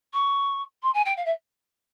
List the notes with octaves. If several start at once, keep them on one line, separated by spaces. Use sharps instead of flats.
C#6
C6
G#5
G5
F5
E5